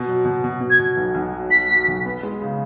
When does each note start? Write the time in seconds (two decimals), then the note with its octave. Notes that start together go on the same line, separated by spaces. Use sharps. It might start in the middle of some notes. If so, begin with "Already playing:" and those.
Already playing: B2
0.08 F#3
0.25 B2
0.44 B2
0.61 B2
0.70 G#6
0.79 B2
0.97 B1
1.15 B1
1.33 F#3
1.51 F#3 B6
1.69 F#3
1.88 B1
2.05 B3
2.23 G#3
2.42 C#3